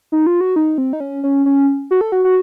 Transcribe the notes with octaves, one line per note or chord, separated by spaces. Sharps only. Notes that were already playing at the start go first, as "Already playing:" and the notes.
D#4
F4
F#4
D#4
C4
D#4
C#4
C#4
C#4
F#4
A4
F#4
F#4